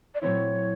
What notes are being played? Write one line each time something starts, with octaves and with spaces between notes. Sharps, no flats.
D5
A#2 F#3 A3 C4 E4 C#5